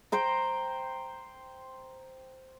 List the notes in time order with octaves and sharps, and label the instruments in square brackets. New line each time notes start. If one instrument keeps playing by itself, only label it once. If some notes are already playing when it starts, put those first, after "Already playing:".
[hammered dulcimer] C5 G5 A#5